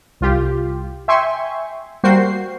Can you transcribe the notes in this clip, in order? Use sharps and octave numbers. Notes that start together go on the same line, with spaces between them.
C2 F4 G4
E5 G5 G#5 C6 C#6
G3 A#3 F#4 C5 G5 C7